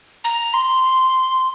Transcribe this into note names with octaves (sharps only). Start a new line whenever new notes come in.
A#5
C6